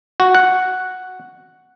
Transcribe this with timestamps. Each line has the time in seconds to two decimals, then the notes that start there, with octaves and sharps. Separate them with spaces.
0.20 F#4
0.34 F#5